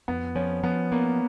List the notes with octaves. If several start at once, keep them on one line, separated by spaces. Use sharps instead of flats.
F2 B3
F3 C#4
F3 B3
A#3 B3